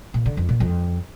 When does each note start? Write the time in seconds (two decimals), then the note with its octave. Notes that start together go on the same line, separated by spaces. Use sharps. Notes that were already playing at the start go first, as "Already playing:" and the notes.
0.14 A#2
0.26 D3
0.37 F2
0.49 A#2
0.60 F2